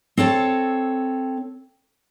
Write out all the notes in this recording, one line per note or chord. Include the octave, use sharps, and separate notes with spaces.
C4 A4 C#5 A5